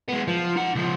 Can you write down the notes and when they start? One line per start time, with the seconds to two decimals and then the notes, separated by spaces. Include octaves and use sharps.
0.09 G#3 B3
0.28 F3
0.57 D#4 F#5
0.75 C#2 F3